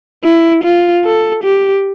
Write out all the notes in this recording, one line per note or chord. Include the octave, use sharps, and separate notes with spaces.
E4
F4
A4
G4